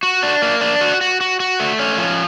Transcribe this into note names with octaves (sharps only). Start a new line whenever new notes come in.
F#4
D4
A#3
D4
F#4
F#4
F#4
F#4
A3
C#4
F3